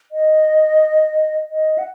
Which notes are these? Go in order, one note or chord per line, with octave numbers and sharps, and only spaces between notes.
D#5
D#5
F#5